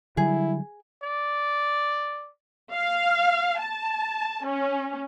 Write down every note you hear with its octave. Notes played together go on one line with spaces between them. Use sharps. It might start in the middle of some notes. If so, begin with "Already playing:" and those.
D3 F#3 G3 E4 G#4
D5
F5
A5
C#4